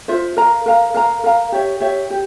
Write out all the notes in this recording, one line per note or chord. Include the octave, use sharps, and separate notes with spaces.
F4 C5 E5
A#4 F5 A#5
A#4 F5 A#5
A#4 F5 A#5
A#4 F5 A#5
G4 C#5 E5
G4 C#5 E5
G4